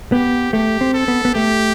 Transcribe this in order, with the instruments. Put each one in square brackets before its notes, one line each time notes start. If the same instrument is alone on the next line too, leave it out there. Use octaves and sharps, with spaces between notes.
[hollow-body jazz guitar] B3 [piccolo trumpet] G4
[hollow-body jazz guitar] A3 [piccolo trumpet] G4
[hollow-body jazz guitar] C4
[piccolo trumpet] A4
[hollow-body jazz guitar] B3
B3
[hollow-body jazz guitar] A3 [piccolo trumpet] G4